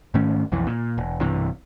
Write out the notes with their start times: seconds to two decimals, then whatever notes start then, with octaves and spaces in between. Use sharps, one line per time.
0.14 G#2 D#3 A3 C#4
0.52 B1 F2 E3
0.67 A#2
0.98 E1
1.21 B1 G2 C3 E3